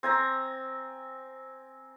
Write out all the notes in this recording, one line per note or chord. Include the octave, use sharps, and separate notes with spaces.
C4 G#5 A#5